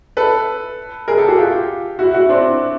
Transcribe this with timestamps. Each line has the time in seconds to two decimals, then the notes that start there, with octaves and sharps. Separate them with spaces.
0.17 A4 B4
1.08 G#4 A#4
1.18 G4 A4
1.28 F#4 G#4
1.38 F4 G4
1.99 E4 F#4
2.14 E4 F#4
2.29 C4 D4